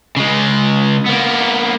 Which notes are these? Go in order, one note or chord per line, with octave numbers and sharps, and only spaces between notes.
C#3 G#3
A#3 B3